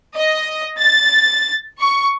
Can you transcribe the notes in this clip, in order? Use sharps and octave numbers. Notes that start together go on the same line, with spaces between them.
D#5
A6
C#6